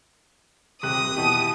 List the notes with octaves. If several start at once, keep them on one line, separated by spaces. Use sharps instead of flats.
D#1 C3 D#6 F#6
B2 E3 G4